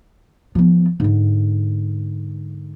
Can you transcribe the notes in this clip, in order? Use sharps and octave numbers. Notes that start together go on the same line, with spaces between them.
F3 B3
G#2 D3